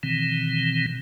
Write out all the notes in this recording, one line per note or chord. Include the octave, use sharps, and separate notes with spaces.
B2 D#3 E3 C4